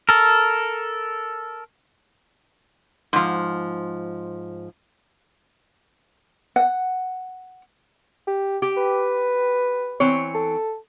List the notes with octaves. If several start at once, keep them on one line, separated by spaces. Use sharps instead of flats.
A4 A#4
G#2 F3
F#5
G4
G4
B4
E3 C4 C#5
A4